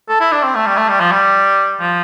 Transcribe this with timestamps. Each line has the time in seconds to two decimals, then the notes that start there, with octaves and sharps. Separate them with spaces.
0.09 A4
0.20 E4
0.32 D4
0.43 C4
0.55 A3
0.66 G3
0.77 A3
0.89 G3
1.00 F3
1.12 G3
1.80 F3